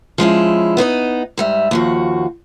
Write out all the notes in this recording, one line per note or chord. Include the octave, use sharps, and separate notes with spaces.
F3 G#3 C#4 E4
B3 D#4 C5 D#5
G#2 G3 E5
D#2 F3 F#4